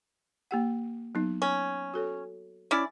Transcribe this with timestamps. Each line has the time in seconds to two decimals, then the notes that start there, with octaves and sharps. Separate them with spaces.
0.51 A#3 G4 F#5
1.15 F#3 B3 D#4
1.42 C#4
1.94 F#4 A4 C#5
2.71 C#4 E4 D5